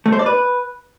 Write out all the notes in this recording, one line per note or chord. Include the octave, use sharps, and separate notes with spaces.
A3
C5
D5
B4